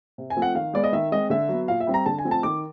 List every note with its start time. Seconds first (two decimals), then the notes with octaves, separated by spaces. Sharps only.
0.18 C3
0.30 G#5
0.37 F3 A3 C4
0.42 F#5
0.55 D#3 F5
0.74 G#3 B3 D5
0.84 D#5
0.93 D#3 E5
1.12 G#3 C4 D#5
1.30 D3 E5
1.49 F#3 B3
1.68 A#2 F5
1.80 E5
1.87 G3 C4
1.94 A#5
2.06 D3 A5
2.19 G#5
2.25 F3 A3 C4
2.31 A5
2.43 D#3 D6